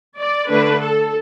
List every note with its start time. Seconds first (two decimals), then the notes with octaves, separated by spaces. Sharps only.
0.19 D5
0.49 D3 A3 D4 B4
0.80 A4